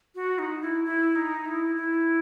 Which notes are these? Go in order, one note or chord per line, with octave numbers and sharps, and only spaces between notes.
F#4
D#4
E4
E4
D#4
E4
E4